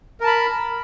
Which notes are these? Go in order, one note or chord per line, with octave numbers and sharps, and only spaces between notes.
A#4 A5 B5